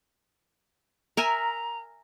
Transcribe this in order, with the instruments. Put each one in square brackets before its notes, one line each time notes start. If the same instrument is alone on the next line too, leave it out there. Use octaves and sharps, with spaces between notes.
[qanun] A#4 E5 G#5 [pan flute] A#5